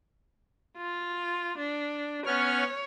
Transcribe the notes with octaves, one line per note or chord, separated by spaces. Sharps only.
F4
D4
B3 C#4 C#5 F6